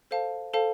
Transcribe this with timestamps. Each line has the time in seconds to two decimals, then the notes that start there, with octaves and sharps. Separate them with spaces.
0.11 A4 C5 F5 A5
0.53 A4 C5 F5 A5